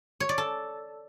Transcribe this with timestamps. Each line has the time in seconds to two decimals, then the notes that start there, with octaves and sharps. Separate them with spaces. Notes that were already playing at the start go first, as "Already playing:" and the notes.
0.20 C#5
0.29 D5
0.38 A4